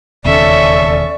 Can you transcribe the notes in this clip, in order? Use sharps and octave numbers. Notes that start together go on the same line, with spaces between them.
E1 D#2 C#3 C#4 A4 D5 E5 C#6